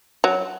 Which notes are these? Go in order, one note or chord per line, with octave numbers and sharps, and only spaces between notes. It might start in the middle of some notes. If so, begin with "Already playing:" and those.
F#3